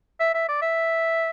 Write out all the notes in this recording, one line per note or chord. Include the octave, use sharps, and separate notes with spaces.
E5
E5
D5
E5